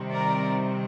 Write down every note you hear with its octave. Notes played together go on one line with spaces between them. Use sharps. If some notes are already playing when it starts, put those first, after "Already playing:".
Already playing: C3 D#3 G3 C4
A#4 D5